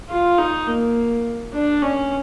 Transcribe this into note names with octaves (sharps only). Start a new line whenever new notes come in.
F4
D#4
A#3
D4
C#4